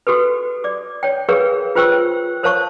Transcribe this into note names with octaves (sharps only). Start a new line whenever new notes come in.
F#4 G4 A4 B4
D5 D6
C#5 G5
G4 G#4 A#4 B4 C#5 F5
F4 B4 C5 G5 C#6 E6
A#4 C5 C#5 F5 A5 C#6